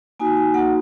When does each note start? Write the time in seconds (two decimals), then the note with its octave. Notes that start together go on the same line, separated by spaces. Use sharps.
0.20 A#3 D#4 F#4 G#5
0.37 G#5
0.54 A#3 D#4 F#4 F#5